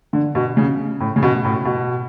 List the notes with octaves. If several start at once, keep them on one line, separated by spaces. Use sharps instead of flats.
D3
B2
C#3
A2
C#3
B2
A2
B2